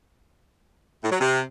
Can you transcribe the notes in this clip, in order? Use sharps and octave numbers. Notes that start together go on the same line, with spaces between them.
A2
F#3
C3